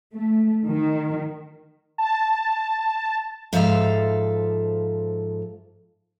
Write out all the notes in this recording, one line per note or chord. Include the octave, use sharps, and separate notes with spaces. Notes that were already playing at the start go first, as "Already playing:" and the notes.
A3
D#3
A5
G#2 F3 A4 E5 F5